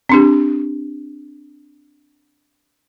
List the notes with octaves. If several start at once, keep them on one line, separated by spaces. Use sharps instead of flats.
C4 D4 G4